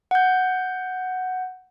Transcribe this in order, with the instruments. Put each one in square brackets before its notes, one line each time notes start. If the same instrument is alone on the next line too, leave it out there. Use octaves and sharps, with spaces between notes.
[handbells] F#5 G6